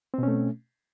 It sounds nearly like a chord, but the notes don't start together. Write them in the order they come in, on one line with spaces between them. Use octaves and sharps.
C4 B2 C#4 A3